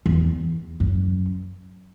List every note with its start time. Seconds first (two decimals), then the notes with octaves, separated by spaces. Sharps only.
0.06 E2
0.80 F#2